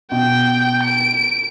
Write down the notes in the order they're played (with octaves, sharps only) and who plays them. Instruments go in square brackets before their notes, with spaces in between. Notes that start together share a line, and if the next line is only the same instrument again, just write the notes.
[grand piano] B2 [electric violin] G5
[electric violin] D7